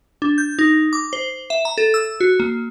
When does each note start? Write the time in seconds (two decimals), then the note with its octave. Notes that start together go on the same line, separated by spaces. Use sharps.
0.22 D4
0.38 G6
0.59 D#4
0.93 D6
1.13 C5
1.50 E5
1.65 A#5
1.78 A4
1.94 E6
2.21 F#4
2.40 A#3